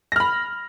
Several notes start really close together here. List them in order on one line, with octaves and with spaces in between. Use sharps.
A#6 F6 B5